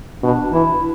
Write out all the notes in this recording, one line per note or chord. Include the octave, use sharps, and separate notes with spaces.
B2 D4
E3 E4